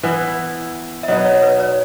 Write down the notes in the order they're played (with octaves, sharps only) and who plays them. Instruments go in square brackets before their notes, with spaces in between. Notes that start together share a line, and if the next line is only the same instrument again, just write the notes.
[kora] E3 B3 E4 [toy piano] B4
[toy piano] E5
[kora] B2 F#3 B3 D#4 [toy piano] D#5
[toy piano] C#5
B4
C#5